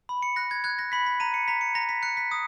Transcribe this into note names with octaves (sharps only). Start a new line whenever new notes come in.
B5
C#7
F#6 A#6
G#6
F#6 G#6
A#6
B5 B6
B6
A#5 D#7
C#7
A#5 B6
C#7
A#5 A#6
B6
F#6 C#7
B6
D#6